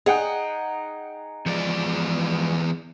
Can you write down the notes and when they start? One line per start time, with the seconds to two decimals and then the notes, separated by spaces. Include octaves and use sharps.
0.06 D#4 G#4 F#5 G5
1.46 E2 F3 G#3 D5